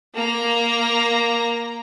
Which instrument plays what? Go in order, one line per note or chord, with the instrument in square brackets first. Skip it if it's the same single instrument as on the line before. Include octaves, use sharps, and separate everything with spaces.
[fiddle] A#3 A#5